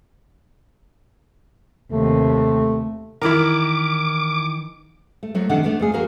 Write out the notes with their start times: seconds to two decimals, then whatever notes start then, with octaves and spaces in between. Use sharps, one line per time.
1.92 D#2 C3 A3
3.22 D#3 E3 E4 A#4 D6
5.23 A3
5.35 F3 F#3 A3
5.49 C3 D#3 D4 A4 F#5
5.63 A3 B3 D4
5.80 F2 A3 G#4
5.93 A#3 F#4 A#4 B4